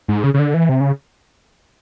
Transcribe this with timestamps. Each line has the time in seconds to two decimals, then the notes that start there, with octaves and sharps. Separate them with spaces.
0.08 G#2
0.24 C#3
0.34 C#3
0.39 D3
0.54 E3
0.69 C3
0.80 C#3